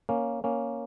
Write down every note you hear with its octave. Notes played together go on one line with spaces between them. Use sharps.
A#3 C#4
A#3 C#4